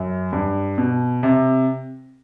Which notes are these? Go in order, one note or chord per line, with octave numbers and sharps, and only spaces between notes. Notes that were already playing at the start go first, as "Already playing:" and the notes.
Already playing: F#2
G2
B2
C3